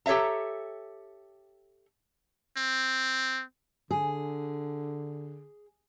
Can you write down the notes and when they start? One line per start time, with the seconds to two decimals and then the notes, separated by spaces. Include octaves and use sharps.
0.06 G4 A4 C#5 E5 A#5
2.57 C4
3.91 D3 G#4